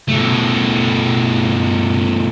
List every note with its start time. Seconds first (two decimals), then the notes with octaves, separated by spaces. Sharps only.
0.09 B2 A3